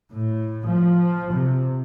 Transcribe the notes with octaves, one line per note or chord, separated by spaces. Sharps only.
A2
F3
C3